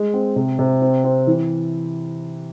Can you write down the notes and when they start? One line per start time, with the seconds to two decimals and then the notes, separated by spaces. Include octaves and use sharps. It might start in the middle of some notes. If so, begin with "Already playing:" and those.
Already playing: G#3
0.14 C4
0.36 C3
0.59 C3
0.81 C4
1.04 C4
1.27 E3